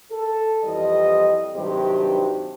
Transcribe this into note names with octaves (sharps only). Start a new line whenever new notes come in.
A4
F2 E3 G3 D#5
G2 C3 D#3 F#3 G4 C5